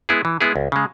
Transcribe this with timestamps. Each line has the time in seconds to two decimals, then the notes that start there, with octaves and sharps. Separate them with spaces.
0.09 G#3 B3 E4 G#4
0.25 E3
0.41 G#3 B3 E4 G#4
0.56 C#2
0.72 C#3 G#3